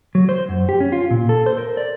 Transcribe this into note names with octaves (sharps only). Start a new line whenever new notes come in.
F#3
C5
F#2
G4
C#4
F4
A#2
A4
C5
A#4
D5